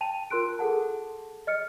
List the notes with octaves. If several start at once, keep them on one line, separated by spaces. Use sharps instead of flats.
G5 A5 D#7 F7
F4 A#4 C6 F#6 D7
G#4 A4 F#5 A5
D#5 F6 C#7